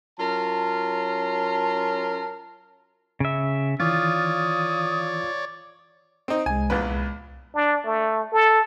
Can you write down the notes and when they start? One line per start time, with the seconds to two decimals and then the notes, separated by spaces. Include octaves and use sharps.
0.19 F#3 C#4 F4 A#4 A5
3.20 C#3 E5
3.80 D#3 E3 F4 C#5 D5 D#6
6.28 C4 D#4
6.46 C2 G#3 G#5
6.70 A#1 E2 B4
7.55 D4
7.85 A3
8.33 A4